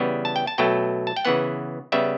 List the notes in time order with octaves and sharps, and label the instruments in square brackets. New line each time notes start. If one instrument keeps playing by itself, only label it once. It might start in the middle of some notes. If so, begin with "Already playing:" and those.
Already playing: [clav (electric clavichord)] C#3 E3 G3 B3
A5
G5
A5
B2 F#3 A3 G5
A5
G5
C#3 E3 B3 F#5
C#3 G3 B3 E5